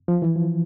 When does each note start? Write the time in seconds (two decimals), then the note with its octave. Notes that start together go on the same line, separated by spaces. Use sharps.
0.08 F3
0.22 E3
0.36 F3